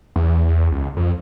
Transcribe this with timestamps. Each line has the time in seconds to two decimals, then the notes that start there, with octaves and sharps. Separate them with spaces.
0.16 E2
0.45 E2
0.72 C#2
0.97 F2